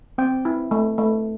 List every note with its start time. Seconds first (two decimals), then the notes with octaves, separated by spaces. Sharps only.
0.18 C4 G5
0.45 E4
0.71 A3
0.98 A3